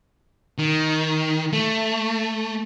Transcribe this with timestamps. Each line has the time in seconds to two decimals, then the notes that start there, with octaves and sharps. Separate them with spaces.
0.58 D#3
1.53 A3